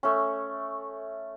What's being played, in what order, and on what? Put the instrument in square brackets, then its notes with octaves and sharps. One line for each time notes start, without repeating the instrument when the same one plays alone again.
[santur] A3 C#4